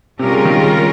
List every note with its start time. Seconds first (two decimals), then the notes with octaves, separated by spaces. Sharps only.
0.19 C3 G3 C#4 F4 A#4
0.32 C#3
0.45 D#3
0.58 C#3
0.70 G#3